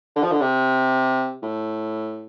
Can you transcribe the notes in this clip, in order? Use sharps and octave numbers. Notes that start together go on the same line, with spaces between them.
D3
F3
D3
C3
A2